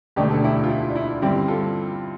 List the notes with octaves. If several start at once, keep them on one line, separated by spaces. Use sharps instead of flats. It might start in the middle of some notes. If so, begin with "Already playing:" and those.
E1 D2 D3 A3 D4 G4
A4
E4 G4
F4
E4
D4
E4
G2 D3 G3 C4 E4 G4
F4 A4